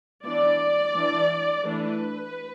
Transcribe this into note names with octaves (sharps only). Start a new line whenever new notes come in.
E3 B3 D4 D5
E3 D4
E3 A3 D4 B4